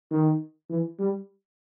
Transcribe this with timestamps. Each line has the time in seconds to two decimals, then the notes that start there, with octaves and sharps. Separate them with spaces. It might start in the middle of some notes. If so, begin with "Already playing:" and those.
0.11 D#3
0.70 E3
0.99 G3